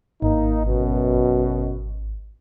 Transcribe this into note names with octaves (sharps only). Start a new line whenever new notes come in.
G#1 A#3 D#4
F#2 B2